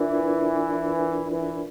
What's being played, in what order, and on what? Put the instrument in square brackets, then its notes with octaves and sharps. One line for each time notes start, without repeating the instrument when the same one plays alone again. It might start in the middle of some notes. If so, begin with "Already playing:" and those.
Already playing: [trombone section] E3 [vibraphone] D4 F4 A#4 D5
[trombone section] E3